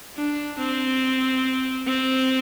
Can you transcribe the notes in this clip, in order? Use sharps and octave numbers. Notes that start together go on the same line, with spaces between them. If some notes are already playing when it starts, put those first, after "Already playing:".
D4
C4
C4